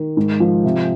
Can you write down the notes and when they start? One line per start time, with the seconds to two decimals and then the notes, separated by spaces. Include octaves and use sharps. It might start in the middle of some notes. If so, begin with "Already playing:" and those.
Already playing: D#3
0.17 G#2
0.40 F3
0.64 C3